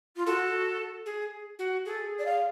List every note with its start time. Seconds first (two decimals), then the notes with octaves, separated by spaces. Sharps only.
0.16 F4
0.26 F#4 A4
1.06 G#4
1.59 F#4
1.86 G#4 A4
2.18 D5
2.25 F5